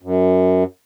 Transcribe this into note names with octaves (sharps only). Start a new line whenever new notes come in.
F#2